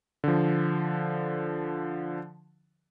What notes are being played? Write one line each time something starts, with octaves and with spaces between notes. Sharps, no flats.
D3 F3